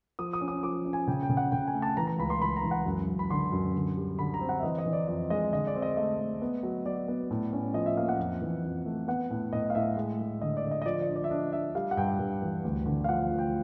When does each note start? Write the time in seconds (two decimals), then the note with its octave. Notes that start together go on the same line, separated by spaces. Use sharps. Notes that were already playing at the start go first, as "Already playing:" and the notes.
0.19 F3 D#6
0.33 D#6
0.41 C#4
0.48 D#6
0.63 F3 D6
0.85 C#4
0.93 G#5
1.08 C#3 G5
1.23 G5
1.30 C#3
1.37 F#5
1.52 C#3 G5
1.67 G#5
1.74 A3
1.82 A5
1.97 E3 A#5
2.07 A#5
2.18 C#2 B5
2.30 C6
2.41 C#2 B5
2.56 A#5
2.63 E3
2.71 F#5
2.86 F#2
3.08 F#2
3.19 B5
3.30 D3 C6
3.52 F#2
3.74 D3
3.97 G3
4.19 D3 B5
4.34 A#5
4.41 C4
4.49 F#5
4.59 E5
4.63 E3 D#5
4.78 D#5
4.86 E3
4.93 D5
5.08 F2 D#5
5.30 G#3 D#5
5.52 D3 D#5
5.67 D5
5.75 C4
5.82 D#5
5.97 A3 D#5
6.19 A3
6.42 B3
6.63 F#3
6.86 F#3 D5
7.08 B3
7.31 A2
7.53 C#4
7.74 F3 D#5
7.86 E5
7.97 A#3 F5
8.09 F#5
8.19 F2
8.42 E3
8.64 F2
8.86 A3
9.08 B3 F#5
9.30 A2
9.53 A2 D#5
9.70 F5
9.75 A2 E5
9.97 G#3
10.19 G#3
10.42 D3 D#5
10.57 D5
10.64 D3
10.71 D#5
10.82 D#5
10.86 F3 D5
11.01 D5
11.09 D4
11.16 D5
11.24 E5
11.30 D4 D#5
11.53 D4 E5
11.75 G3 F5
11.91 F#5
11.97 G2 G5
12.19 G2
12.42 E3
12.65 D2
12.86 D3
13.04 F5
13.09 F3 F#5
13.31 F3
13.39 G5